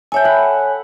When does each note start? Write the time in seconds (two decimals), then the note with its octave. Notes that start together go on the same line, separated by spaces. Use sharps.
0.12 A4 C#5 E5 G5 G#5
0.25 F#5 B5